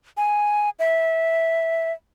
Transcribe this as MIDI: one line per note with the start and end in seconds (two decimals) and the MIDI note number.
0.17 0.70 80
0.79 1.92 76